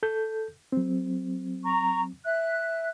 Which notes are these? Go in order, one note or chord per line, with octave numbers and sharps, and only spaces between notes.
A4 G6
F#3 C4
A#5 C#6
E5 F#6